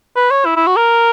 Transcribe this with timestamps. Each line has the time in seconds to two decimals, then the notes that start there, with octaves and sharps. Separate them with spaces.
0.16 B4
0.31 C#5
0.46 E4
0.56 E4
0.67 F#4
0.76 A#4